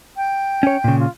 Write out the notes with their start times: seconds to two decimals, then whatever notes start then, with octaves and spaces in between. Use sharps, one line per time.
0.17 G5
0.63 C#4 C#5
0.84 A#2 C#3
1.00 F4